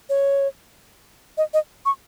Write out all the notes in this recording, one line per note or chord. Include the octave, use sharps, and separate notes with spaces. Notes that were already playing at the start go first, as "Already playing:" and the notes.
C#5
D#5
D#5
C#6